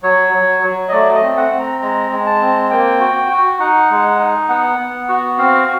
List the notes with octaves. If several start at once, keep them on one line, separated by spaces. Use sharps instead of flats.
F#3 C#5
F#3
F#3
D#5
A3 D5
D#5
C4
F#5
C4
A#5
G#3 A#5
G#3
A5
C4
A#3 G5
F#4
F#4
D#4 F#5
G#3
D#4
B3 F#5
B3
F#4
C4 F5